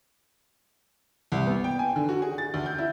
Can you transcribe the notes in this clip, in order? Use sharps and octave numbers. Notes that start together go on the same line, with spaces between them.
C2
B3
G5
G#5
D3
F#4
G#4
A6
D2
G6
E4